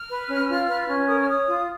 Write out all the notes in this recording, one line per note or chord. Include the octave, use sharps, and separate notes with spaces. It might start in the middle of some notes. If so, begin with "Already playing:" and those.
Already playing: F6
B4
C#4
F4
B4
C#4
A#4 D#6
F6
C#5 D#6
F4